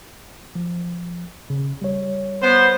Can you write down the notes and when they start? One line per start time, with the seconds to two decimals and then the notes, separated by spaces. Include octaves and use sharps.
0.55 F3
1.50 C#3
1.82 G3 C#5
2.41 B3 C5